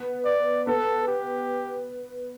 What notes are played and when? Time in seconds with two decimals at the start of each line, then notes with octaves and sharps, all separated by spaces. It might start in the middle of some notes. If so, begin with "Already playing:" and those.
Already playing: B3
0.25 D5
0.67 B3 A4
1.08 G4